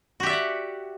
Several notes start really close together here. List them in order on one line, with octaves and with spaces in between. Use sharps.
F#4 G4 E5 D5 F#5